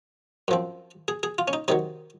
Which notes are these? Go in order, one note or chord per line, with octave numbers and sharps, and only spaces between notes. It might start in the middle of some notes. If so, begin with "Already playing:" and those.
F#2 F3 C4
G#4
G#4
F4
C#4
D#4
C3 D#3 F#3 D#4